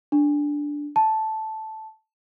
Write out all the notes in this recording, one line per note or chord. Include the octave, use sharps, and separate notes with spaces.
D4
A5